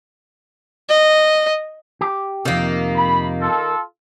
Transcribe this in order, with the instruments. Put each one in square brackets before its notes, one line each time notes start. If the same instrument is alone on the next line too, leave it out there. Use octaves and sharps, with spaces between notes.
[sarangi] D#5
[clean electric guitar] G4
[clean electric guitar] F2 C3 [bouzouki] D#3 A#3
[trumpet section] B5
F4 A4